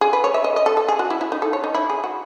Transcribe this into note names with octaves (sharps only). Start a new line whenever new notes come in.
G#4
B4
C#5
E5
D#5
D#5
A4
A4
G#4
F#4
E4
E4
D#4
A4
C#5
D#4
E4
G#4
F#4